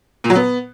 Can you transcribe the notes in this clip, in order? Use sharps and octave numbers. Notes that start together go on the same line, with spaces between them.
A#2
F#3
B3